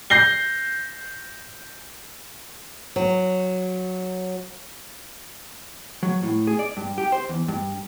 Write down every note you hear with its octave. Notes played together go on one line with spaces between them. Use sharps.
G6 A#6 C7 G7
F#3
F#3
A2
G#4
D5
G2
G4
C5
E2
G2